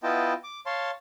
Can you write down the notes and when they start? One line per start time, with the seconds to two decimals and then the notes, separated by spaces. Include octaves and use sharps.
0.03 B3 E4 F4 D#5 G5 A5
0.44 D6
0.66 C#5 F5 A5 C6